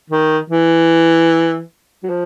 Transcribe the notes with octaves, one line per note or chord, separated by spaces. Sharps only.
D#3
E3
F#3
F3